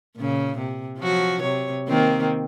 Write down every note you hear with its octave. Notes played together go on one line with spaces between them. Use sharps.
A#2 C#3
C3
F3 F#3 F#4
C3 C#5
D#3 A#3 C4